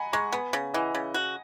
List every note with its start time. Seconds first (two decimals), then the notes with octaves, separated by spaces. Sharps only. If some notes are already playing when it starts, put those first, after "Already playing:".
Already playing: D#5 F#5 G#5 A#5 B5
0.13 G#3 A#5 C#6
0.32 B3 G#5 B5
0.53 C#3
0.74 E3 D#5 F#5
0.95 C#3
1.14 F#4